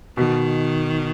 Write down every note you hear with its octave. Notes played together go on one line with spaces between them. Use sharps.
B2 D#3